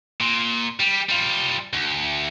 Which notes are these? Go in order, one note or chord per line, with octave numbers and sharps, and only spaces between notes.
A#2
G3
G3 F4
D2